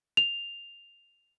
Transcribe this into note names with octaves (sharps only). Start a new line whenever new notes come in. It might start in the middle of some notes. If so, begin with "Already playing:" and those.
F7